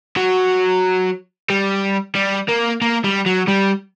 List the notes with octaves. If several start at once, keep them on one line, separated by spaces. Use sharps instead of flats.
F#3
G3
G3
A#3
A#3
G3
F#3
G3